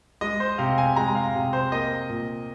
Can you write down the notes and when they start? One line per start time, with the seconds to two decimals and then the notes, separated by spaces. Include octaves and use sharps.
0.21 G#3 D#5
0.40 C5
0.58 C3 F5
0.78 G#5
0.96 G#3 A#5
1.15 F5
1.35 C3
1.53 C5
1.72 A#3 D#5
2.09 A#2